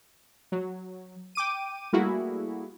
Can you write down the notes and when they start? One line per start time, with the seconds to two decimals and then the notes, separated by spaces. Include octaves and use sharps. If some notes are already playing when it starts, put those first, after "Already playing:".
0.52 F#3
1.35 G5 D6 D#7
1.93 G3 A3 A#3 E4 F#4 G#4